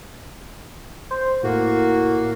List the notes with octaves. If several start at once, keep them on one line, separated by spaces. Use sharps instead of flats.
C5
A2 A#3 F#4